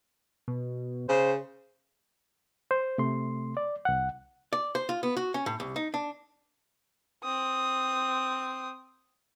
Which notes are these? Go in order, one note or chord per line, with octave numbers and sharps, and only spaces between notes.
B2
C#3 C5
C5
C3 A3 C6
D5
C2 F#5
D5
C5
F4
B3
F#4
C#4
A2
C2
D#4
D4
C4 D#6